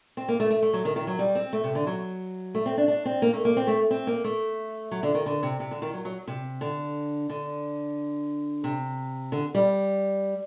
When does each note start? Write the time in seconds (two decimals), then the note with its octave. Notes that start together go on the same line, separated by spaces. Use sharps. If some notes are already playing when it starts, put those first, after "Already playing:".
0.17 C4
0.28 A#3
0.40 A3
0.50 A3
0.63 A3
0.73 F#3
0.85 D#3
0.96 D#3
1.07 F#3
1.19 G3
1.35 C4
1.53 A3
1.64 C3
1.75 D3
1.87 F#3
2.55 A3
2.66 C4
2.78 D4
2.88 D4
3.05 C4
3.22 A#3
3.33 A3
3.45 A#3
3.57 C4
3.67 A3
3.91 C4
4.07 A#3
4.24 A3
4.91 F#3
5.03 D3
5.14 D#3
5.26 D3
5.43 C3
5.60 C3
5.71 D3
5.82 D#3
5.93 F#3
6.05 F#3
6.27 C3
6.61 D3
7.29 D3
8.64 C3
9.32 D3
9.55 G3